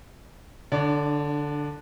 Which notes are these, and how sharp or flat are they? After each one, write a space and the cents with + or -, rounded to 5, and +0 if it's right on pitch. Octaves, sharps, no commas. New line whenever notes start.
D3 +0 D4 +25 D5 -40